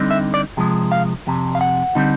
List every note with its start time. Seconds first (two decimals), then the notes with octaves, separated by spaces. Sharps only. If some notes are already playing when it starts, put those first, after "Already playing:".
Already playing: D3 G3 C4 D#4
0.11 E5
0.34 D5
0.57 C3 F3 G#3
0.92 F5
1.27 F2 C3
1.55 F5
1.61 F#5
1.95 D3 G3 C4 D#4